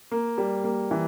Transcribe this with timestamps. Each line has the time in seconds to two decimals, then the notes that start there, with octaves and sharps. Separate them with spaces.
0.11 A#3
0.38 G3
0.64 A#3
0.91 E3